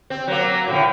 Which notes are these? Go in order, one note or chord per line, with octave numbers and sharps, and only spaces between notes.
C4
F#3 A#3
A2 C#3 F3